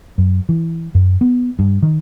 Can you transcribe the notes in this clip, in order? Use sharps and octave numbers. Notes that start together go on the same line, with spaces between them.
F#2
E3
F#2
B3
G2
D#3